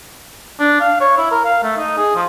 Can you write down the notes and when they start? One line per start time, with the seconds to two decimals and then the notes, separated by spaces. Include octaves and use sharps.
0.60 D4
0.81 F5
1.00 C#5
1.17 E4
1.31 A#4
1.44 F5
1.63 A3
1.77 D#4
1.97 G#4
2.16 F3